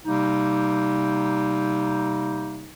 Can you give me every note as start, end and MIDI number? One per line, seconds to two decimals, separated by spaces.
0.06 2.73 48
0.06 2.73 55
0.06 2.73 58
0.06 2.73 63